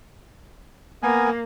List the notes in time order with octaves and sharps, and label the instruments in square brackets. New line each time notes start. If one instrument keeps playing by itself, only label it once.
[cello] A#3 [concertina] B3 A#4 G#5